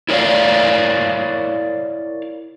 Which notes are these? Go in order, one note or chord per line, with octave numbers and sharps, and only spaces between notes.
E4 A#4 C#5 D5 F5